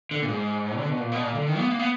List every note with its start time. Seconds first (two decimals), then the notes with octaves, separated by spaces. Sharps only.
0.11 D3
0.22 A#2
0.28 G#2
0.78 D3
0.89 B2
1.00 A#2
1.12 B2
1.23 A#2
1.34 D3
1.47 D#3
1.59 B3
1.70 A#3
1.79 B3